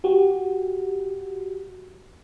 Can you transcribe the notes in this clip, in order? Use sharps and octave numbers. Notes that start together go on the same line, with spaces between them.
F#4 G4